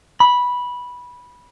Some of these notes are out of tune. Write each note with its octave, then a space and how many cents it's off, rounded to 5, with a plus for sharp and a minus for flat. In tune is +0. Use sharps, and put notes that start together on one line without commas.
B5 -10